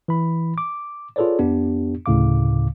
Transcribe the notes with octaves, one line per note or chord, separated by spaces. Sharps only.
E3 B5
D6
F4 G#4 A4 B4 C#5 D5
F2 B3 D4 G4
D2 A2 C#3 F5 D6